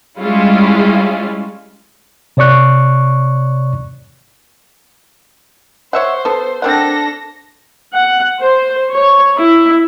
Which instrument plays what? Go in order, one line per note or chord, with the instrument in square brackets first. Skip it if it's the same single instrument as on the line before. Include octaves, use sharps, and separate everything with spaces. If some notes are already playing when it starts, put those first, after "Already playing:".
[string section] G3 G#3 C#4 E4 F4
[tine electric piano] C3 C#5 D5 C#6 F#6
[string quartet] C5 [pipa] C#5 E5 F#5
[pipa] B3 A4
[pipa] C4 A#4 F#5 [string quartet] D4 A4 A#6
[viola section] F#5
C5
C#5
E4